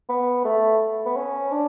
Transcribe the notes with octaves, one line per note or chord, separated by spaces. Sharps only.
B3
A3
B3
C#4
D4